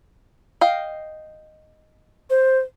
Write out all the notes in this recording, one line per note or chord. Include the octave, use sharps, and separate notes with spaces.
D#5 F5 G5
C5